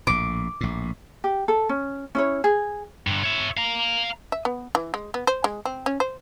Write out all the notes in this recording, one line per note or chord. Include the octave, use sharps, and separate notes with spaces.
A#1 A2 D6
A#1 A2
G4
A4
C#4
C#4 E4 C#5
G#4
G2 D3
C#5 E5
F5 A#5
E5
B3
E3
G#3
B3
C5
G#3
C4
C#4
C5